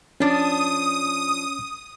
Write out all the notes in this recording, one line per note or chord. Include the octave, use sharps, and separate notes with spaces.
F3 C#4 D4 D#6